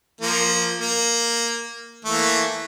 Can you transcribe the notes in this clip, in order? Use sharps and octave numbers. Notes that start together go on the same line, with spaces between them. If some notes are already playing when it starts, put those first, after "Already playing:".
F3 A#3
A#3
E3 A3 A#3